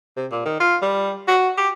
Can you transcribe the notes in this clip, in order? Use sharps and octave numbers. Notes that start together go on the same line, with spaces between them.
C3
A#2
D#3
F4
G3
F#4
G4